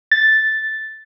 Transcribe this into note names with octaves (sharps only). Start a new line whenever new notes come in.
A6